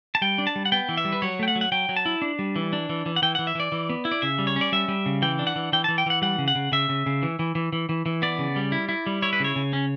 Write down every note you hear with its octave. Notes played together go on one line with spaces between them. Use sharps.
A5
G3 G5
D4
A5
G3
F#5
B3 G5
E3
E5
G3
B4
F#3 C#5
A3 G5
F#5
F#3
F#5
F#3 G5
F#3
A5
E4
D4
G3
E3
D4
E3
E3
F#5
E3 G5
E3 F#5
E5
E3 D5
E3
B3
E4
D5
C#3 E5
G3
C#5
C#4
D5
G3 E5
G3
C#3
E3 G5
D4
F#5
E3
E3 G5
E3 A5
G5
E3 F#5
G3 F#5
C#3
F#5
C#3
C#3 E5
C#3
C#3
E3
E3
E3
E3
E3
E3
B3 D5
C#3
G3
E4
E4
G3
E4 C#5
B4
C#3 C#5
C#3
C#4